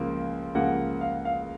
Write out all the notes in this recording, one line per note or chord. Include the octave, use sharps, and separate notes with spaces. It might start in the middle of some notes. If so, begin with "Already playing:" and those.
Already playing: C#2 C#3 F3 A#3
C#2 C#3 F3 A#3 F#5
F5
F5